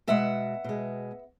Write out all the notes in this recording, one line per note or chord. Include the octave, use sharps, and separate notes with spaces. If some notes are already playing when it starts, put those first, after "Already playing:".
B2 G#3 E5 F#5
B2 G#3